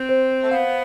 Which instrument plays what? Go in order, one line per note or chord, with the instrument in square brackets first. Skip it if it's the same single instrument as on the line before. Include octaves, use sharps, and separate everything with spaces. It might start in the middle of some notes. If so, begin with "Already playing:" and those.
Already playing: [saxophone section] C4
[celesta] C5
C5
[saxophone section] A3
[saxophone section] B3 [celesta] F5